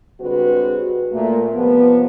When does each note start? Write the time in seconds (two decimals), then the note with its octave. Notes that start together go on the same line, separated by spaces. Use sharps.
0.19 D3 G3 G#3 C4 F#4 B4
1.12 A#2 A3
1.54 C3 F3 G3 B3